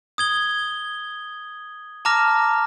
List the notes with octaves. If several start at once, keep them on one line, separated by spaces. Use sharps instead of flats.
D#6 G#6 G7
A5 A#5 D6 F6 A#6